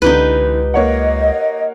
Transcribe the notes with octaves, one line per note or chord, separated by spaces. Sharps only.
C#2 D3 E3 D#4 G4 B4
A#3 C#5 D#5 F#5